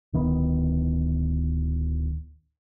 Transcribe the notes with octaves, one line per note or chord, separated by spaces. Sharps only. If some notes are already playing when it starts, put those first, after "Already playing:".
D1 D#3 B3